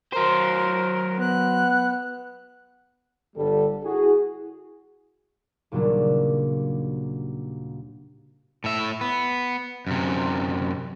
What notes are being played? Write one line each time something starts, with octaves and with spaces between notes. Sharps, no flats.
F#3 A#4 C5
B3 F#6
G1 D3 G3 A4
E4 F#4 G#4
D#2 A#2 C#3 F#3 G3 D4
A2 E5
B3
F#2 C3